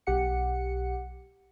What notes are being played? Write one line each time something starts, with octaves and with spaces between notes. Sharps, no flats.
B1 G4 F#5 C#7